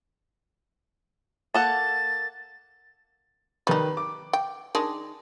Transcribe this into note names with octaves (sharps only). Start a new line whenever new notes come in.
A#3 A4 F#5 A6
D#3 G3 D#4 B4
D6
G5
D#3 G#3 D4